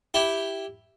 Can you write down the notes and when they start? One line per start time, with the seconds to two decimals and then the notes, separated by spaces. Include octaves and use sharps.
0.14 E4 G4